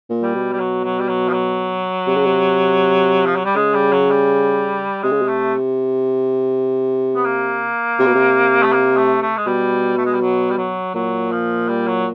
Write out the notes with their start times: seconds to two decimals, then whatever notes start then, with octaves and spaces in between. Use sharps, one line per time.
0.10 A#2
0.22 G3
0.35 B2
0.53 G3
0.60 F#3
0.84 F#3
1.00 G3
1.09 F#3
1.29 F3
1.33 F#3
2.07 C3
2.17 C#3
2.27 C3
3.26 F3
3.36 F#3
3.45 G3
3.55 C#3 G#3
3.74 G3
3.93 F#3
4.11 G3
5.03 C3 G#3
5.12 C#3
5.22 C3
5.28 A3
7.16 B3
7.25 A#3
7.99 C3
8.06 B2
8.14 C3
8.63 A3
8.73 A#3
8.97 A3
9.22 A3
9.37 G#3
9.47 B2 G3
9.98 A3
10.05 G#3
10.14 G3
10.21 F#3
10.51 G3
10.58 F#3
10.95 A#2 F#3
11.32 F3
11.69 G3
11.87 F#3